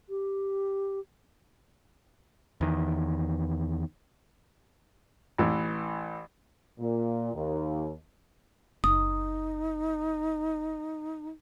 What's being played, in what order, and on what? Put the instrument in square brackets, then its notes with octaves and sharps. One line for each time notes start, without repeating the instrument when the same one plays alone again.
[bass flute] G4
[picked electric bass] E2 D#3
[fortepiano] A1 E3
[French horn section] A#2
D#2
[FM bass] F#1 [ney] D#4 [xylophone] D#6